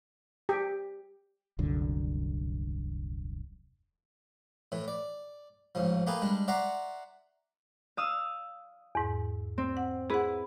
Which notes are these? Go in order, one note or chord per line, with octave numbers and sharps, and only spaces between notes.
G4
D#1 C2 F#2 D3
A2 E3
D5
A1 G#2 C#3 F3
A3 A#3 G4 G#4 B4
G3 G#3 D4
D5 E5 F#5 A#5 C6 C#6
F5 D#6 E6
E2 G#2
C4
F#5
E4 G#4 B4 F#5